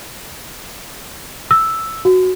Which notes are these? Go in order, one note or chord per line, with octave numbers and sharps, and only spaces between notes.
E6
F#4